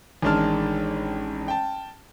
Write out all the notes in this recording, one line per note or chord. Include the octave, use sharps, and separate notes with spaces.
A1 D#3 G#3 D4 A5 F6
G5 A5